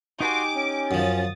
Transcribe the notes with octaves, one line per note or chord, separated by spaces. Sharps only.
D#4 F#4 G4 G#5 C6 D6
C#4
F#2 F3 D#6 A6